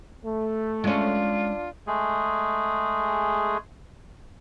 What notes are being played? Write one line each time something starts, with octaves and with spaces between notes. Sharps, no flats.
A3
G#3 C#4 D4 F4
G#3 A3 G#4